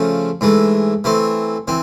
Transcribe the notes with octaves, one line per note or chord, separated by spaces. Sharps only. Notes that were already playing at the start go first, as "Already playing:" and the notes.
Already playing: C#3 F3 A3
G#2 E3 A3
E3 A3 C4
E3 C4